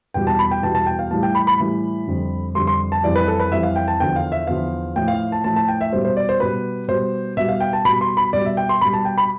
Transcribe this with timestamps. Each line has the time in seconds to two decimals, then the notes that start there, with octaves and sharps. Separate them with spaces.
0.14 E2 B2 G3 G5
0.27 A5
0.39 B5
0.51 G5
0.63 E2 B2 G3 A5
0.75 A5
0.86 G5
0.99 F5
1.11 A2 E3 G3 A5
1.23 G5
1.35 B5
1.47 B5
1.59 A2 E3 G3
2.08 F2 D3 G3
2.55 F2 D3 G3 C6
2.67 C6
2.92 A5
3.03 F2 E3 G3 D5
3.16 B4
3.28 A4
3.40 B4
3.52 F2 E3 G3 E5
3.63 F5
3.76 G5
3.88 A5
4.00 E2 D3 F3 G5
4.16 F5
4.32 E5
4.47 E2 D3 F3 F5
4.96 A2 F3 G5
5.08 F5
5.32 A5
5.44 A2 F3 A5
5.56 A5
5.68 G5
5.81 E5
5.92 G3 C5
5.96 B2
6.05 C5
6.17 D5
6.29 C5
6.40 B2 G3 B4
6.88 B2 G3 C5
7.37 B2 G3 E5
7.49 F5
7.61 G5
7.73 A5
7.85 B2 G3 B5
8.01 C6
8.17 B5
8.33 B2 G3 D5
8.45 E5
8.57 G5
8.69 C6
8.81 B2 G3 B5
8.93 A5
9.05 G5
9.18 B5